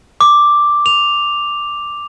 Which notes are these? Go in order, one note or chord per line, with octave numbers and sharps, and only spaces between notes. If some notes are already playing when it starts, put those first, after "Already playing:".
D6
F7